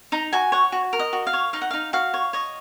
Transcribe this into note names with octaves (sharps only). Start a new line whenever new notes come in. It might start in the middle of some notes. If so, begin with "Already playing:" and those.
D#4 A#5
F#4 G#5
C#5 F#5
F#4
A#4
D#5
F#4
F5
C#5
D#4 F5
F#5
D#4 F5
F#4 F5
C#5
C#5 D#5